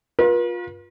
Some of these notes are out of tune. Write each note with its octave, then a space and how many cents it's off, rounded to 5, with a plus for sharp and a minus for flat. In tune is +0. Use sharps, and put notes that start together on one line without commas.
F4 +25 B4 -45